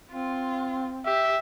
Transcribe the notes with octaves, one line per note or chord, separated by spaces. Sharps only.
C4 F4
G4 E5